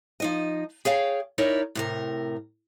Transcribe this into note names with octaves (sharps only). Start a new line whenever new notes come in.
F3 D#4 D#5
G#4 C#5 F5 G5
D#4 E4 A#4 C#5 D5
A2 C3 A#4